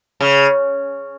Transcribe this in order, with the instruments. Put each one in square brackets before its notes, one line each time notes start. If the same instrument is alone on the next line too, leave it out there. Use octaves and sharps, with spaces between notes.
[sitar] C#3